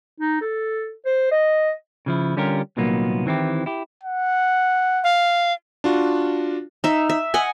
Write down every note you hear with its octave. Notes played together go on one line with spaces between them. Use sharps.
D#4
A4
C5
D#5
C#3 F3 E4
D3 G3 C#4 F4 G4 A#4
C2 A#2 D#3 F#3 A#3 B3
D#3 E3 C4 E4 G4
E4 G4
F#5
F5
D4 F4 F#4
D#4 E5
E5
D#5 F#5 G#5